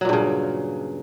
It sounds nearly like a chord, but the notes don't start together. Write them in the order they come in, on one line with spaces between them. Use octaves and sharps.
F#3 A#2 G2 C#3